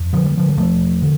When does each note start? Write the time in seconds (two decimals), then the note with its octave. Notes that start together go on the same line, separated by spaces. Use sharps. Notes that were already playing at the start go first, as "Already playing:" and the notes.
Already playing: F2
0.13 D3 F3
0.25 G3
0.37 D3 F3
0.49 G3
0.57 E1 F3 A3
1.02 D3